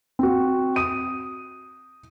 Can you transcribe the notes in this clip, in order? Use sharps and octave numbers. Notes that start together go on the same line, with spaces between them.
C4 F#4
D#6 D#7